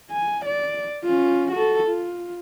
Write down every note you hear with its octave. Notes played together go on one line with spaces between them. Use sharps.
G#5
D5
C#4 F4
F#4 A4
F4